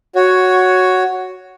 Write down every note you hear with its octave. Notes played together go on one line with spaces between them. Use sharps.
F#4 C#5